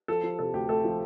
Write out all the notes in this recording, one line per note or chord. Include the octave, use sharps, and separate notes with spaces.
F3 A4
F3
C3 A4
D2 G4
A3 A4
F3